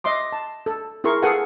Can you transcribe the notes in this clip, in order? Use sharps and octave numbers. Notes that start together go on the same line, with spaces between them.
D#5 E5 C6 D6
A5
A4
E4 G#4 A#4 C6 C#6
G#4 A4 B4 F5 F#5 G#5